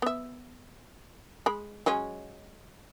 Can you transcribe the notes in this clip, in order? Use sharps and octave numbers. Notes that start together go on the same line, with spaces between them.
B3 E5
G#3 B5
F#3 G#3 C#4